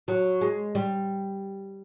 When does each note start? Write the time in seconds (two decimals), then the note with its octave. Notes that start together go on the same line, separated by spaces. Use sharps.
0.08 F#3
0.41 G#3
0.75 G3